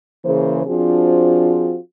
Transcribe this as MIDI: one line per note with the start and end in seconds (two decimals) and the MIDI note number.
0.25 0.62 49
0.25 0.62 52
0.25 0.62 58
0.25 0.62 68
0.25 0.62 72
0.67 1.76 53
0.67 1.76 60
0.67 1.76 62
0.67 1.76 65
0.67 1.76 66
0.67 1.76 68